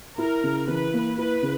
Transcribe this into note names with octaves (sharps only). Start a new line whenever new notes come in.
E4 A#4
C#3
E3 B4
A#3
E4 B4
C#3